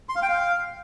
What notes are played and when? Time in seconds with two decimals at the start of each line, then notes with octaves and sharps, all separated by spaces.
0.09 C6
0.16 F5
0.22 G5
0.29 F5